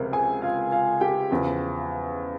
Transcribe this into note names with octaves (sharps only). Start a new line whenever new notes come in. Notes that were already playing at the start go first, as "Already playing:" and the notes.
Already playing: C#2 C3 F3 A#4
G#4 G#5
F4 F5
F4 F5
G4 G5
E2 C#3 F3